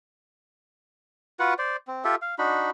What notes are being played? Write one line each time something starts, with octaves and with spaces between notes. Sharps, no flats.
F4 F#4 B4 F#5
C5 D5
C4
F4 G4 A4 E5
F5
D4 D#4 F#4 B5